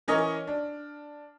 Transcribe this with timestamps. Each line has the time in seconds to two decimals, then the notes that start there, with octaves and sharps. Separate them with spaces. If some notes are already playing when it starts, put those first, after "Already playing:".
0.08 E3 C#4 A#4 C#5 D#5 F6
0.47 D4